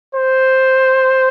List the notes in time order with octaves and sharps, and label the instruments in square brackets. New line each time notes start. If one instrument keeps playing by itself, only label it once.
[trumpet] C5